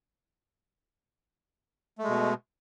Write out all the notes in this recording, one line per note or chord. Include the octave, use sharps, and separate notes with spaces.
B2 G#3 A3